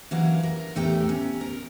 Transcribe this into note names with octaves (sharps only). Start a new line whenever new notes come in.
E3 F#3 A#3 C#4 A#4 F#5
A#4
E2 A2 A3 G4 G5 A#5
C#4
A#4